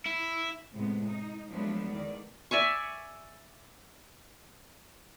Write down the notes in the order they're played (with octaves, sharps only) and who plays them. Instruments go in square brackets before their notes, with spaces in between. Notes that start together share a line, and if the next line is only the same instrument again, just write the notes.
[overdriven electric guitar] E4
[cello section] A2 C3 G#3 B3
D#4
F3 F#3 G#3 A3 B3 D4
E2 D#3 D5
[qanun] D5 E5 G#5 C#6